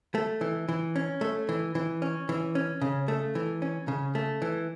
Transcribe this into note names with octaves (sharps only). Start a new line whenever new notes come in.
A3
E3
E3
C#4
A3
E3
E3
C#4
E3
C#4
C#3
A3
E3
C#4
C#3
A3
E3